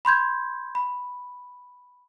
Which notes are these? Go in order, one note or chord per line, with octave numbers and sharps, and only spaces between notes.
B5 C6 G6 G#6
B5